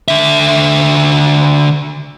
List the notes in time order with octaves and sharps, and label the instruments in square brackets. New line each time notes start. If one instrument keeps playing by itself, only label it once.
[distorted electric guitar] D3 E5